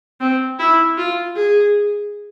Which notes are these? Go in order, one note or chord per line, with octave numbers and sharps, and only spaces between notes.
C4
E4
F4
G#4